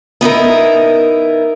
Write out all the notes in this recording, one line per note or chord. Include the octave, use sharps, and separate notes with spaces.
B3 D#4 E4 A#4